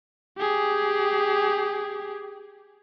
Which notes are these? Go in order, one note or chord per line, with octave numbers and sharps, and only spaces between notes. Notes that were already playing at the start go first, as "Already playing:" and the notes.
G4 G#4